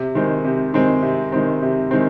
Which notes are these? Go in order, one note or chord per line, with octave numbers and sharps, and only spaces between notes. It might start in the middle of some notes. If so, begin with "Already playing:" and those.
Already playing: C3
D#3 G#3 C4
C3
D#3 G#3 C4
C3
D#3 G#3 C4
C3
D#3 G#3 C4